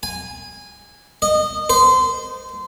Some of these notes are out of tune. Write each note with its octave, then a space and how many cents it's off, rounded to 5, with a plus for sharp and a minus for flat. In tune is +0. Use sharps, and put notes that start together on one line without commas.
G#5 -20
D#5 -25
C5 -25